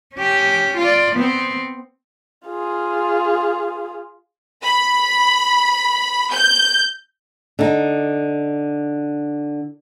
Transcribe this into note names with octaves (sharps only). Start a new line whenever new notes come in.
C#4 G4
F4 D5
B3 C4
F4 G#4
B5
G6
D3 D#4